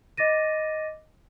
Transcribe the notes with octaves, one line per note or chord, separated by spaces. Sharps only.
D#5 D6 A6 A#6 D#7